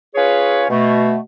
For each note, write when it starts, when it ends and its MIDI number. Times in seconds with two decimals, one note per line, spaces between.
0.14 0.66 61
0.14 0.66 65
0.14 0.66 68
0.14 0.66 71
0.14 0.66 73
0.69 1.16 47
0.69 1.16 57